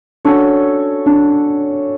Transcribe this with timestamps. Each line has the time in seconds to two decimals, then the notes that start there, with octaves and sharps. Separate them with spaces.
0.25 C#4 D4 F#4 A4 C#5
1.06 D4